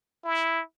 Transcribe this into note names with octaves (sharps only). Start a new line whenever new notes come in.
E4